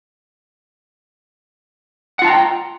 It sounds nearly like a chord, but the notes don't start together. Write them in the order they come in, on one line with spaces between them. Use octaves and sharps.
F#5 F4 A5 A#5 G5